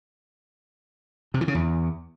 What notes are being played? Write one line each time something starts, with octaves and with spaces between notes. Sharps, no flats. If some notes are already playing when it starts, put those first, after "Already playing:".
C3
E3
C#3
E2